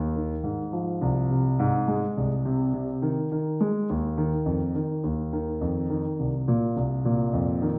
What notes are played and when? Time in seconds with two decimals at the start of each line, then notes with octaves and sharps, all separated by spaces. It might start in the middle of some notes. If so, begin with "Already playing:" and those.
Already playing: D#2
0.15 D#3
0.44 G#2
0.72 F3
1.01 C2
1.31 C3
1.59 G#2
1.88 G#3
2.17 C2
2.45 C3
2.73 C3
3.02 D#3
3.32 D#3
3.61 G#3
3.90 D#2
4.18 D#3
4.46 F2
4.75 D#3
5.04 D#2
5.33 D#3
5.61 F2
5.90 D#3
6.19 C2
6.48 A#2
6.76 C2
7.05 A#2
7.33 F2
7.62 D#3